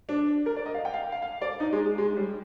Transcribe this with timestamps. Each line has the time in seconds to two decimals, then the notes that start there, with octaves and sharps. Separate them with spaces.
0.09 D4
0.46 A#4
0.56 D5
0.66 D#5
0.74 F5
0.85 G5
0.94 F5
1.12 F5
1.22 F5
1.42 D5
1.60 D#4
1.73 G#3
1.85 G#3
1.98 G#3
2.17 G3